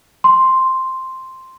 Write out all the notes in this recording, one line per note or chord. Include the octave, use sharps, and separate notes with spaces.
C6